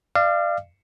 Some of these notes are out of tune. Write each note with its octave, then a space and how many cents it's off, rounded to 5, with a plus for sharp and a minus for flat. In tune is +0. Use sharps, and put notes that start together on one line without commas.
D5 +30 F5 -25